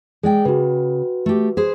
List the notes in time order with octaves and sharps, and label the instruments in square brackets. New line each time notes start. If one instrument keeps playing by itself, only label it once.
[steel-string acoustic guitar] G#3 D5 G5 [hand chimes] G#4
[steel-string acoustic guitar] C#3 [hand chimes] F#4 B4
[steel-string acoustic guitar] A3 G4
G#4 B4 C5